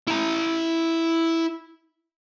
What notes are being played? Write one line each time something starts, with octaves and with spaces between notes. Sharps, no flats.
E4 A#5